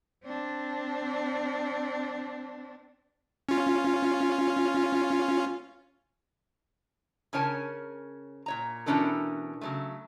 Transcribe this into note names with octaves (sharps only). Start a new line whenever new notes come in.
C4 D4
C#4 F4
C#3 C#4 A#4 C#5 G#5 A5
A#2 C#5 A#5
B2 E3 C#4 D4 A4 A#4
C#3 F#3 A3